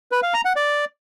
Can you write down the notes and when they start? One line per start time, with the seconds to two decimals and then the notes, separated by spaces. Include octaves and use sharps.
0.12 B4
0.23 F5
0.34 A#5
0.45 F#5
0.56 D5